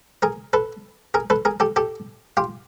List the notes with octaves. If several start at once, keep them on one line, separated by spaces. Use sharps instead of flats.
G#4 A#4
A4 B4
G#4 A#4
A4 B4
G#4 A#4
G4 A4
G4 A4
F4 G4